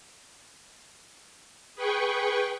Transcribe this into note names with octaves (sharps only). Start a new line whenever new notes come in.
G#4 B4 G5 C#6